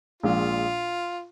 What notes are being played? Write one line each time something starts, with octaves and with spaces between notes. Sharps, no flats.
A#1 A#2 G#3 F4